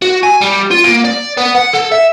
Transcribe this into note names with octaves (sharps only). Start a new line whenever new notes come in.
F#4
G#5
G3
F4
A#3
D5
B3
F#5
A4
E5